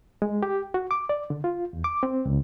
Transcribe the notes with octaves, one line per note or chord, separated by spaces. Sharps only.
G#3
G4
F#4
D6
D5
D3
F4
E2
D6
C4
C#2